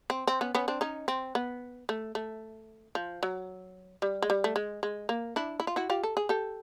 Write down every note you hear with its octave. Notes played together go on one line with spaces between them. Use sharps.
C4
C4
B3 C#4
B3 C#4
C4 D4
C#4 D#4
C4
B3
A3
A3
F3
F#3
G3
G#3
G3
A3
G#3
G#3
A#3
D4 E4
E4
F4
E4 F#4
F4 G4
A4
G#4
G4 A4